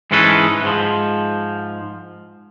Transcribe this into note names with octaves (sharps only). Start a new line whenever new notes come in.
G#2 E3 G#3 C#4 A4 B4
G#2 F3